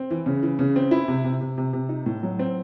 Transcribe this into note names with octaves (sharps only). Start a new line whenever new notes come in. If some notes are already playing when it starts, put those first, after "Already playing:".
Already playing: C4
E3
C#3
E3
C#3
C4
E4
C3
C3
C3
C3
C3
D#4
A2
F#3
C4